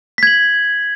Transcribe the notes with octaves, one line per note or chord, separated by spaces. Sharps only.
G#6 B6 F#7